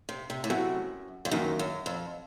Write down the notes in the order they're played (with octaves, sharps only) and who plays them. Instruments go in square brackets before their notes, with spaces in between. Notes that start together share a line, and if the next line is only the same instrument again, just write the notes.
[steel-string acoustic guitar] C3
C3
A2
[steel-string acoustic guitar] F#2 [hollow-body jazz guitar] C3 F#3 A3 C4 F#4
[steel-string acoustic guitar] F2
[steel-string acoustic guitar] F#2 [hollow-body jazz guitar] D#3 F#3 A#3 D#4
[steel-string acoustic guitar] F#2
F2